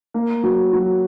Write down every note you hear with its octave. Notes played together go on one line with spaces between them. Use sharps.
A#3
F#3
F#3